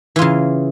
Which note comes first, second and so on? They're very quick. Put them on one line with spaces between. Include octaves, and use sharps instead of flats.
E3 F4 C#3